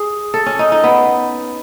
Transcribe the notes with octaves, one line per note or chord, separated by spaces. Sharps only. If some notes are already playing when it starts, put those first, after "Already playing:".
Already playing: G#4
A4
C#4
D#4
D#4
B3